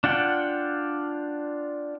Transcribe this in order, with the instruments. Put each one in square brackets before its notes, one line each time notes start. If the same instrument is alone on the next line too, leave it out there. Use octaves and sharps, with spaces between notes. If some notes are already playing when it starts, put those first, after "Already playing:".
[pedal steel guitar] D4 F4 F#5 G5